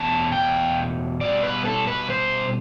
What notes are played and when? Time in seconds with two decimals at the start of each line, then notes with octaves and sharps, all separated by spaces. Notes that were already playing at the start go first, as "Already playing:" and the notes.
Already playing: E2 B2 A3 A5
0.32 G5
1.21 B2 G3 D5
1.43 B4
1.65 A4
1.87 B4
2.10 C5